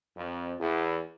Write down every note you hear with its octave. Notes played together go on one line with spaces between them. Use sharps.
F2
E2